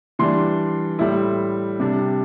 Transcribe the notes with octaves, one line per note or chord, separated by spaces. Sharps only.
E3 G3 D4 C6
A2 G3 E4
C3 G3 D4